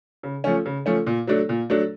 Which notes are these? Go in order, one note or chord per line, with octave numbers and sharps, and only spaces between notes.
C#3
F3 A3 C#4
C#3
F3 A3 C#4
A#2
F#3 A3 D4
A#2
F#3 A3 D4